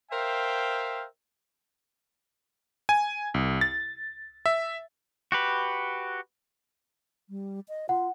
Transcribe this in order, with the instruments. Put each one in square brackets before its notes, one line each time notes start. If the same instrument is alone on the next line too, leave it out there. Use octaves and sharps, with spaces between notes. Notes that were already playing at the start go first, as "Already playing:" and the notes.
[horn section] A#4 C5 E5 F5 G5
[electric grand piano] G#5
C2
A6
E5
[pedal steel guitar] F#4 G4 B4
[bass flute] G3
D#5
[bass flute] F4 [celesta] F#5